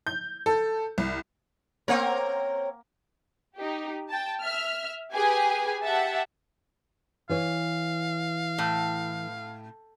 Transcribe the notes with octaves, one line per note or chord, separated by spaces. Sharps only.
G6
A4
C2
A#3 C4 A#4 C#5 F#5
D#4 G4
G5 A5
E5 F6
G4 G#4 B4 G#5
G4 E5 F#5 A5
E3 B4 C#5 F5
A2